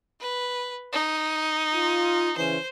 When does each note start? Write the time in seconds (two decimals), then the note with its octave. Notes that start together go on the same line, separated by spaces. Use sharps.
0.21 B4
0.93 D#4
1.75 F4
2.38 C#3 E3 C#4 C5